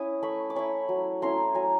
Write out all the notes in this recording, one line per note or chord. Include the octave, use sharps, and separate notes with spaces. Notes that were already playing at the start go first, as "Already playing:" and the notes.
Already playing: C#4 E4 D#6
A3 B5 C#6
D6
C#4 E4 B5 C#6
F#3
A3 C#4 E4 A#5 C6
F#3 G#5 A#5